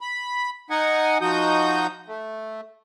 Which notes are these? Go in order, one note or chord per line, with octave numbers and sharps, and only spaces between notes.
B5
D#4 D#5 F#5 G#5
F3 D#4 F#4 D#6 G6
A3